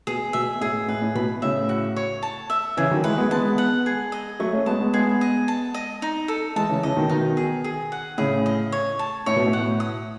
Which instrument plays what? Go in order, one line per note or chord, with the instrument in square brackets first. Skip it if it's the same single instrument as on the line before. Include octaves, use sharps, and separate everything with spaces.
[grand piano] B2 [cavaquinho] G#4
[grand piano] B2 [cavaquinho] E5
[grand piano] A2 [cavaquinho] G#4
[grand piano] A2 [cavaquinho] B4
[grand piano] A2
[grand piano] B2 [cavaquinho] B5
[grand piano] A2 C#3 [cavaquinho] E5
[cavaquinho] F#4
C#5
A5
E5
[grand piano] C#3 E3 [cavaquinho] G#4
[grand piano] D#3 F#3
[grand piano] E3 G#3 [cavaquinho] B4
[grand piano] G#3 B3
[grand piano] G#3 B3 [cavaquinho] A5
[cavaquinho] F#5
G#4
D#5
[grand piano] F#3 A3 [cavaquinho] C#6
[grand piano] A3 C#4
[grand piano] G#3 B3 [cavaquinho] A5
[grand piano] G#3 B3
[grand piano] G#3 B3 [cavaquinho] G#4
[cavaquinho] D#5
A5
D#5
D#4
A4
[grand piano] E3 G#3 [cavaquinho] A5
[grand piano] C#3 E3
[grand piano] C#3 E3 [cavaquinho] D#5
[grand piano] B2 D#3
[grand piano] B2 D#3 [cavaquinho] D#4
[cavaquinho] G#4
G#4
F#5
[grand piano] A2 C#3 [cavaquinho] G#4
[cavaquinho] D#5
C#5
A5
[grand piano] A2 [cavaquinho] C#5
[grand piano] B2
A2
[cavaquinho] F#5
D#6